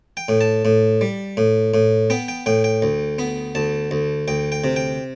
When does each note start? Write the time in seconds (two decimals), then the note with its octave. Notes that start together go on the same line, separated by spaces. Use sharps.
0.17 G5
0.29 A2
0.41 A5
0.65 A2
1.01 G3
1.37 A2
1.74 A2
2.10 B3 G5
2.28 G5
2.46 A2 G5
2.64 G5
2.82 D2
3.19 B3
3.55 D2 A5
3.91 D2
4.28 D2 G5
4.52 G5
4.64 C3
4.76 G5